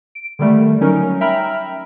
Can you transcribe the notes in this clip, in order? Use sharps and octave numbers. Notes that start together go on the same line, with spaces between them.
D7
D3 D#3 G3 A3
F#3 C#4 D#4 A#4
E5 G5 A#5 B5 F6